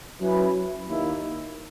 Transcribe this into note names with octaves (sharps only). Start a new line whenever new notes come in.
F#3 C#4 E4 B4
D#2 D#3 A#3 E4